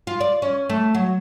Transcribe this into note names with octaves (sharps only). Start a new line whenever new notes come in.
F4
D5
C#4
A3
F#3